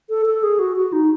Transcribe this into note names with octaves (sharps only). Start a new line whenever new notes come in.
A4
A4
G#4
F#4
F#4
D#4